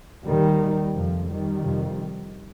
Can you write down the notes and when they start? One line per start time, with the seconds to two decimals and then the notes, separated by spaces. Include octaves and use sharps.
0.25 D#2 D#3 G3
0.94 F2 C3 F3
1.28 D#3 G3
1.63 F2 C3